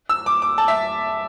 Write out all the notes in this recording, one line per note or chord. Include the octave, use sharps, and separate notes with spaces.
E6
D6
D6
A5
E5